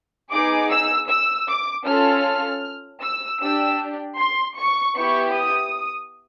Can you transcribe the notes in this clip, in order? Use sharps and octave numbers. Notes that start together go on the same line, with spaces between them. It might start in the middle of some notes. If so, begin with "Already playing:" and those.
B3 D#4 G#4 D6
E6
E6
D6
C#4 F4 A4 F6
E6
D4 G4 E6
C6
C#6
B3 E4 G4 C#6
D#6